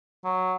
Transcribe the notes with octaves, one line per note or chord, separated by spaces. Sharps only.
F#3